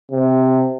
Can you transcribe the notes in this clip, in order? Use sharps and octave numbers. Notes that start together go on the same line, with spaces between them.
C3